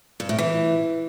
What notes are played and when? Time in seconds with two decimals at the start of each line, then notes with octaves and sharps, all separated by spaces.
0.20 G2
0.29 A2
0.38 E3